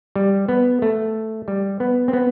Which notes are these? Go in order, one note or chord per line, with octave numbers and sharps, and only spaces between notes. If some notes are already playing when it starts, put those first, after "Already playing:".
G3
B3
A3
G3
B3
C4
B3